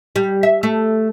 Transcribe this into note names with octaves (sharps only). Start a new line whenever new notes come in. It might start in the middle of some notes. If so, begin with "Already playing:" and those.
G3
E5
A3